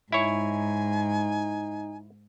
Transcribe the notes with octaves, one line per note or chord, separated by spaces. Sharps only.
G#2 D#4 E4 C#5 G#5